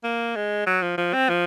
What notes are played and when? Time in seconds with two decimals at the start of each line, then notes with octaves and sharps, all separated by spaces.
0.04 A#3
0.35 G#3
0.66 F#3
0.82 F3
0.98 F3
1.13 C4
1.29 F3